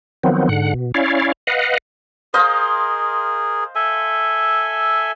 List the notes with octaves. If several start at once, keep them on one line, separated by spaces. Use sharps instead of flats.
D#3 F3 F#3 B3 C4
G#2 D3 F#5
B2
C#4 E4 C#5 D5 F5
B4 D#5 F5 F#5
G#4 A#4 C5 D#5 F5
A4 E5 G#5